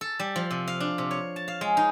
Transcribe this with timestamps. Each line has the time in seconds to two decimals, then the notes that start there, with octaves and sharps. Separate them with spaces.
0.01 A4
0.20 G3
0.36 F3
0.51 C3
0.68 F5
0.80 D4
0.98 C3
1.11 C#5
1.36 A5
1.48 F5
1.61 G#3
1.77 D#4